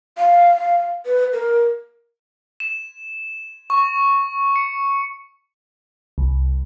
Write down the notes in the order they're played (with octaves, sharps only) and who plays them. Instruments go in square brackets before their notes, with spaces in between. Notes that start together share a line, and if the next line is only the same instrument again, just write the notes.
[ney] F5
B4
A#4
[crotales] E7
C#6
C#7
[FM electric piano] C2